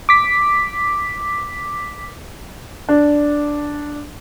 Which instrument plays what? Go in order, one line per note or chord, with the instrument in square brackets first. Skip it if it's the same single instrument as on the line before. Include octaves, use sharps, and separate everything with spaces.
[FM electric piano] D6 B6
[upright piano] D4